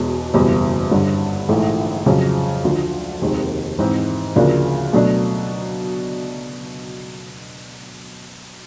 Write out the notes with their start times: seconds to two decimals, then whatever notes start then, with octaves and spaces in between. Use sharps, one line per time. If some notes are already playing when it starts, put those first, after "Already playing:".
Already playing: E1 E2 B2 G#3
0.34 F#1 E2 B2 G3
0.91 G1 G2 D3
1.48 A#1 G#2 E3 A3
2.06 F2 C#3 F#3
2.63 D2 D3 F3
3.21 F1 D#2 D#3 G#3 C4
3.79 G#2 E3 G#3 C4
4.36 D2 C#3 F3 A#3 D4
4.93 B2 F#3 A3 D4